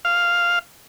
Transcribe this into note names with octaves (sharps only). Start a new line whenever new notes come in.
F5